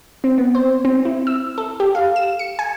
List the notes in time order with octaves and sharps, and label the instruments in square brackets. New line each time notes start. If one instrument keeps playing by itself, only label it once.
[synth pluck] C4
B3
C5
C4
E4
E6
A4
G4
F5
E7
C#7
G#5